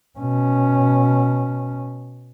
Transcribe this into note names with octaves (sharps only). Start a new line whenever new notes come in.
B2 C#4